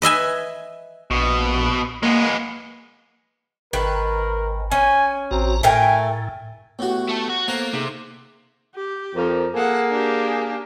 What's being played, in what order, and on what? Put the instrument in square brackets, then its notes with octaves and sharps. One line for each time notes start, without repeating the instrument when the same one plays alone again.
[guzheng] B4 D#5 E5 G#5
[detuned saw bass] A#1 [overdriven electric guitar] B2
[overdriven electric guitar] G#3 B3 [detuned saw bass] A#3
[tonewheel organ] G#1 [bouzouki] D#3 B4 [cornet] A#4
[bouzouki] C#4 [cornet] G#5
[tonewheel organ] A1 F#4 A#5 [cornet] C4
[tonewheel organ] A2 [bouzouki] A3 A#4 G5 [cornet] G#5
[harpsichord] A2 F#4 [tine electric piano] B3 G4
[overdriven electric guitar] A3 A4
F#4
[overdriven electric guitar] A#3 [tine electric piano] B3 C5 F5 [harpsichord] A4 F#5
[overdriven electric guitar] C3 [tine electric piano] A#3 D#4 G#4
[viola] G4
[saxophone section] F2 A#4
[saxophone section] A#3 G#4 [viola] A4 F#5
[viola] D4 G4